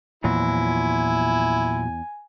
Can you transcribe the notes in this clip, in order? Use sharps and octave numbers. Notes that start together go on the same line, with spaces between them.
E2 A#2 F3 F#3 E4 G#5